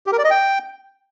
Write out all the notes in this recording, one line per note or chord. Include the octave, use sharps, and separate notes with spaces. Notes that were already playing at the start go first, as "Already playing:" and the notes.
G4
A#4
D5
D#5
G5